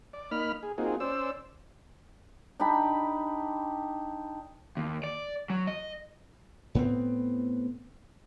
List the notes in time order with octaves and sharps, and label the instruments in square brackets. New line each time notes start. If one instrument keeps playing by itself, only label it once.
[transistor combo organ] D5
A#3 D#4 B5 F6
G#4
A#3 C4 D#4 F4 F#4 G#4
C#4 C5 D5 E6
[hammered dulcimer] D4 D#4 G4 B5
[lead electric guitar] D#2
D5
F#3
D#5
[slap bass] A2 B3 C4